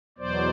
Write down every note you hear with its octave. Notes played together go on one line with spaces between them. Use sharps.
E2 B2 F#3 C5 D5